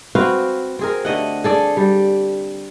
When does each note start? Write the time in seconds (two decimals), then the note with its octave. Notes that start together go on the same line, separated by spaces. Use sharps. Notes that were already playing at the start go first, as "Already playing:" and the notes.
0.15 C4 F#4 B4 F5
0.79 C4 G#4 A#4
1.05 D3 A3 D#5 F#5
1.44 G#4 A4 D5
1.77 G3